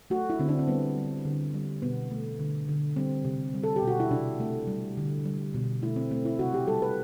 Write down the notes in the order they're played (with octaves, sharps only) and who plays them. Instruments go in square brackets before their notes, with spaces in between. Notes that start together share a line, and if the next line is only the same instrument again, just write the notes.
[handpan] A3 F#4
E4
D3 C4
D4
C4
G3 B3
G3
D3
G3
B2 B3
A3
D3
D3
G3 C4
C3
G3
A4
G4
B2
F#4
E4
C3 D4
A3
G3
D3
G3
B2
A3 E4
C4
A3 C4
E4
C3 F#4
G4
G3 A4
B4